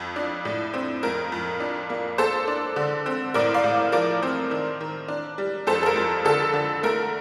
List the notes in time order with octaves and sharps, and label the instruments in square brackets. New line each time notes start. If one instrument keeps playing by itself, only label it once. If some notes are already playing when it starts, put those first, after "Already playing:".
Already playing: [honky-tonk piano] F2
D4
A2
C4
F2 A#4
F2
D4
A#3
A#3 A4 C5
D4
D3
C4
A2 A#4 D5
D5 F5
A2
F3 A#4 D5
C4
D#3
D#3
D4
G3
F2 A4 C5
A4
A#4
F2
D3 A4
D3
A3 A#4